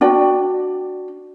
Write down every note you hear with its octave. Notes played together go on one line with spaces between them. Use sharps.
D4 F#4 D5 G5